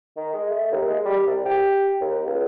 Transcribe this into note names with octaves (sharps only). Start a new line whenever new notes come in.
D#3
G#3
A3
D#2
G#3
G3
C2
G4
D#2
C#2